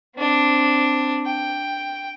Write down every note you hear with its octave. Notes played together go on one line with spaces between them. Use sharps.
C4 D4
G5